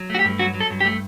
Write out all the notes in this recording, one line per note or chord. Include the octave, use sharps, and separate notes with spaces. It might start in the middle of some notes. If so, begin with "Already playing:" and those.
Already playing: F#3
A3 F#4
G4
G2
F#3 F#4
F#3
A4
G2
G4
A3